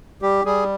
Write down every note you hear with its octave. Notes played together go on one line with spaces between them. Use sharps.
G3 G4
G3 G#4